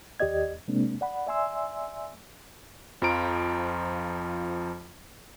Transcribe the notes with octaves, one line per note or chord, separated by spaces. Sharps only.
D#2 G4 D5 D#5 G#6
C3 G#3 A#3 C4 D4
D5 F#5 B5
D5 E5 G#5 C6 E6
F2 F3 F4 A#5 D7